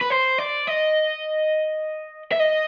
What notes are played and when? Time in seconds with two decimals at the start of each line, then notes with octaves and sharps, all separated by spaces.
0.01 B4
0.10 C5
0.38 D5
0.67 D#5
2.32 E5
2.39 D#5